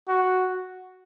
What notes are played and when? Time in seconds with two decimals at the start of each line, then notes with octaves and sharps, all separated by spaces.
0.08 F#4